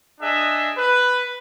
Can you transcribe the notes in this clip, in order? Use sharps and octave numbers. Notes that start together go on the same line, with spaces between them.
D4 G#4 D#5 E5
B4